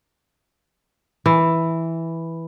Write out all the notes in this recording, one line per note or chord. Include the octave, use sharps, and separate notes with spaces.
E3